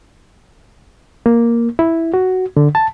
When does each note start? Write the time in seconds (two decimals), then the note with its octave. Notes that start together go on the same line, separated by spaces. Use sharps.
1.26 A#3
1.79 E4
2.14 F#4
2.57 D3
2.75 A5